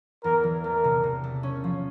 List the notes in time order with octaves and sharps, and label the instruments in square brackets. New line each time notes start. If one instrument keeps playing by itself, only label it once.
[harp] E2 [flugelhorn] A#4
[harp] E3
[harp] A3 [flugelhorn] A#4
[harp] C3
C3
A3
C#4
F3